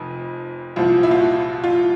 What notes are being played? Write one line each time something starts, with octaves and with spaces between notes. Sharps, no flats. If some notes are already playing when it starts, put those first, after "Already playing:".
Already playing: F1 F2
C2 A#2 F3 F4
E4
F4
F#4
F4